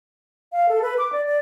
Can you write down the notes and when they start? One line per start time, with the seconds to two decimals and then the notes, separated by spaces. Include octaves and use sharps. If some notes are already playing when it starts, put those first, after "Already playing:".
0.52 F5
0.69 A4
0.82 B4
0.98 D6
1.13 D5
1.26 D5